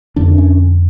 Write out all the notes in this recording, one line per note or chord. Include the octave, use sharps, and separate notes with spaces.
F2 D3 D4
C#4